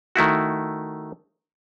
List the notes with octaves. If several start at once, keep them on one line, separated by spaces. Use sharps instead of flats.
D#3 A3 E4 F#4